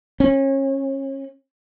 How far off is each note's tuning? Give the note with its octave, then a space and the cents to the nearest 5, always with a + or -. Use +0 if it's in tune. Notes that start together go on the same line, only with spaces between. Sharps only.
C#4 -30